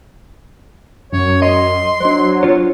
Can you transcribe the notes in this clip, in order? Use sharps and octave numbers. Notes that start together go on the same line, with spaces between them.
F#2 C#5
D#5 C6
F#3 D4 C5
F4 C#5